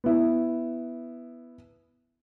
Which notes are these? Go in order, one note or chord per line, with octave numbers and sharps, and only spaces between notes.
B3 E4